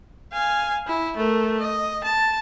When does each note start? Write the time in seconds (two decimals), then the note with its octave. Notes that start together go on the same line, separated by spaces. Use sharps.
0.33 F5 G#5
0.87 E4
1.17 A3 A#4
1.60 D#5
2.04 A5